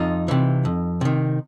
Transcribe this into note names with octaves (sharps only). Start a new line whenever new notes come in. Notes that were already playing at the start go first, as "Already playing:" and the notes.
Already playing: F2 D#4 F4
C3 E3
F2
C3 D#3